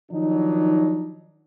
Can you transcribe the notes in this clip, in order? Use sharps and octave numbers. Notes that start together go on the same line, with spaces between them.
D#3 F3 F#3 D4 D#4